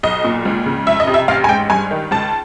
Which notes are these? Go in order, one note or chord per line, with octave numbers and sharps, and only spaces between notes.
B1 D#5
A#2
C#2
C#3
F2 E5
D#5
C3
E5
A1 F5
G#5
G#2 G5
G2 G#5
D#3
C#2 A5